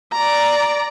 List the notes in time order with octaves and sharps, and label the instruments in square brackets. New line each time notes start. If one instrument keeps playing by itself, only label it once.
[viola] D5 A#5